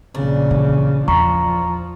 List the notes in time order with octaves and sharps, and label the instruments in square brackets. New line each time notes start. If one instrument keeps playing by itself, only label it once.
[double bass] A#1 C#3 [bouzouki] D4
[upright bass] E3
[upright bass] E2 [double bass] F3 [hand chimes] A#5 C#6